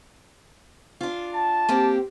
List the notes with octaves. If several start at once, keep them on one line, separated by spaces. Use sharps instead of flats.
D4 F4
A5
A#3 C4 G4